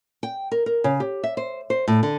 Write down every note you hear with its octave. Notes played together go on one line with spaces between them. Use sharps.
G5
A#4
A#4
C#3
G4
E5
C5
C5
A2
D3